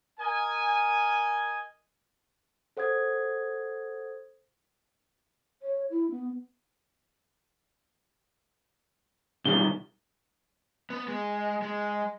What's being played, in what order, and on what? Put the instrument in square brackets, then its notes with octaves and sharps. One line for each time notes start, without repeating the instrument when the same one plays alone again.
[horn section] A#4 D#5 G#5
[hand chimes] A4 C5 F#5 D#6 G#6
[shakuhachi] C#5
E4
B3
[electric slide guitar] B2 D#3 G3 [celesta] G7
[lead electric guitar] B3
G#3
G#3